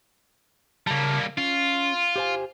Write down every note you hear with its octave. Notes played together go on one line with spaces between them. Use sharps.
C#3 G3 A#3 A5
C#4 F4
G4 C5 G#5